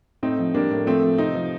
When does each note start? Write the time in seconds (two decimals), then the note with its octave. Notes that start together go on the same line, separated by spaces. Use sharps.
0.23 A2 C4 D#4
0.38 F3
0.54 G3 A#3 D4
0.71 A2
0.87 F3 A3 C4
1.03 F3
1.18 C3 C4 D#4
1.34 F3